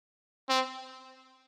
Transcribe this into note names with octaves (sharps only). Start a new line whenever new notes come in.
C4